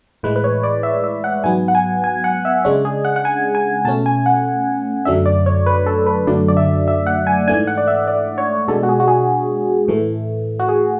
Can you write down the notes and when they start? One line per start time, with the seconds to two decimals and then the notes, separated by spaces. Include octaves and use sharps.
0.23 A2 E3 G#3 B4
0.36 B4
0.44 C#5
0.63 D5
0.83 E5
1.04 E5
1.24 F#5
1.44 G#2 F#3 B3 G#5
1.68 F#5
1.75 G#5
2.04 G#5
2.24 F#5
2.45 E5
2.65 C#3 G#3 D4 C#5
2.85 G#4
3.05 F#5
3.16 F#5
3.25 G#5
3.55 G#5
3.85 B2 A3 C#4 A5
4.06 G#5
4.26 F#5
5.05 F#2 D3 F#3 A3 D4 E5
5.26 D5
5.46 C#5
5.66 B4
5.86 A4
6.06 B4
6.27 F#2 D3 F#3 A3 D4 D5
6.48 D5
6.57 E5
6.88 E5
7.07 F#5
7.27 G#5
7.48 G#2 E3 A3 D4 G#5
7.67 F#5
7.78 D5
7.87 E5
8.07 D5
8.38 C#5
8.68 B2 G#3 D4 A4
8.83 F#4
8.89 G#4
9.00 F#4
9.08 G#4
9.88 A2 E3 A3
10.59 F#4
10.69 G#4